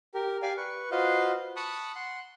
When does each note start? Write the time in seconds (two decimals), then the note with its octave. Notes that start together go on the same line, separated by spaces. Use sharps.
0.14 G4 A#4
0.42 G4 D5 F5 G#5
0.57 B4 C#6
0.91 F4 F#4 B4 C5 D#5 F5
1.56 A5 B5 C#6 D#6 F#6
1.95 F#5 C6